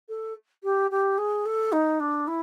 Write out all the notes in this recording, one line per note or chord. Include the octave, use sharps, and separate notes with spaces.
A4
G4
G4
G#4
A4
D#4
D4
E4